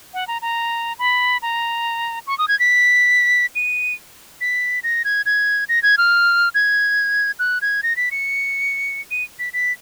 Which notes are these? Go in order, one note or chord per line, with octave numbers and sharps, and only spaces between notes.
F#5
A#5
A#5
B5
A#5
C#6
D#6
G#6
B6
D#7
B6
A#6
G#6
G#6
A#6
G#6
F6
G#6
F#6
G#6
A#6
B6
C#7
D#7
B6
B6